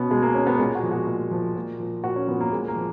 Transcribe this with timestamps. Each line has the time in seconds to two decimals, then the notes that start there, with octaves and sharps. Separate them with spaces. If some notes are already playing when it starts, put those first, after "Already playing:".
Already playing: B2 B3 C#4
0.11 B2 G#3
0.22 A#3
0.35 C#4
0.47 B3
0.59 A#2 G#3
0.75 F#4
0.83 F3
0.91 F#4
1.07 A#2
1.31 F3
1.56 A#2
1.80 F3
2.04 A#2 F#4
2.16 C#4
2.28 F3 B3
2.40 A#3
2.52 A#2 G#3
2.68 A#3
2.76 F3